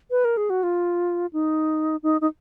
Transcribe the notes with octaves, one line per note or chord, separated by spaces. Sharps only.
B4
A#4
G#4
F#4
F4
D#4
D#4
D#4